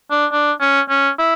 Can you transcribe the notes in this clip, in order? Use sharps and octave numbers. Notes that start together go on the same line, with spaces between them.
D4
D4
C#4
C#4
E4